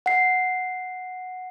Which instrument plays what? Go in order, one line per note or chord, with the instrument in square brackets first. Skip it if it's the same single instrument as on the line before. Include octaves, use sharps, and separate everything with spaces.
[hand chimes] F#5 C7